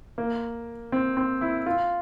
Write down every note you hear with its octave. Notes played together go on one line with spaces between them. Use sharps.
A#3
C4
C4
E4
F4